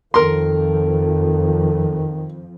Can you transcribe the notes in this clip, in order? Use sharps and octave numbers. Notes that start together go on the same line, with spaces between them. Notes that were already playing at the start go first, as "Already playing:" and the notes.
F2 D#3 F3 A4 A#4 C6